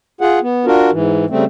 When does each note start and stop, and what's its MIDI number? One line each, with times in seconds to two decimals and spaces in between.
0.21 0.39 65
0.21 0.39 68
0.21 0.39 78
0.42 0.66 59
0.66 0.90 62
0.66 0.90 65
0.66 0.90 66
0.66 0.90 70
0.92 1.25 44
0.92 1.25 52
1.30 1.45 49
1.30 1.45 55
1.30 1.45 57
1.30 1.45 60